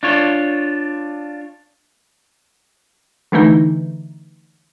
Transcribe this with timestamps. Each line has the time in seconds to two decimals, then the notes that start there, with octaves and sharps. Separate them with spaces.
0.03 D4 F4 C#5
3.32 D3 E3 A3 D#4